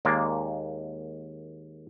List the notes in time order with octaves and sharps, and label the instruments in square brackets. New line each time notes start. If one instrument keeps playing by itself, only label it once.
[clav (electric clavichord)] D#2 G#3 A#3 D5